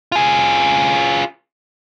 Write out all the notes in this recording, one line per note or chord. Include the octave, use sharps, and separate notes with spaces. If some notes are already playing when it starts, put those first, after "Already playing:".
F4 G#4